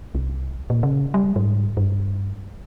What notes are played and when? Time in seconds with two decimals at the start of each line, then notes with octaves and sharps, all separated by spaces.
0.15 C2
0.70 A#2
0.83 C#3
1.14 G3
1.36 G#2
1.77 G2